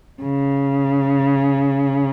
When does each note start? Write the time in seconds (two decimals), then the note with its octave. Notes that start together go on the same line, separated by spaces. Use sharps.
0.22 C#3